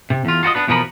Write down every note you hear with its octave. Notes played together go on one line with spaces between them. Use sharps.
C3
E2 F4
F4 F#4 B4 D#5
B3 D4 B4
E2 B2 F3 B3 A#4 B5